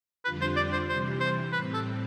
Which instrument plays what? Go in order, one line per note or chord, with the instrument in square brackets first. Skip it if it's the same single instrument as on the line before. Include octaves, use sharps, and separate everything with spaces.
[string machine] F2 D3 G3 D4 F4 [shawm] B4
[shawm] C5
D5
C5
[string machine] C3 E3 G3 [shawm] C5
[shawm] C5
[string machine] A2 G3 C4 [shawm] B4
[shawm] A4